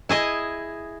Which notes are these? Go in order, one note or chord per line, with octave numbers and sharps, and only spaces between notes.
E4 G#4 D#5